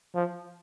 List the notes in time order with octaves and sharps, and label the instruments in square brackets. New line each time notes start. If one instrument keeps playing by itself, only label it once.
[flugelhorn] F3